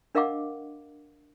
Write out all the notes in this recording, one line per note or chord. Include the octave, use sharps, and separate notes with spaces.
D4 A#4 D#5 F5 F#5 D6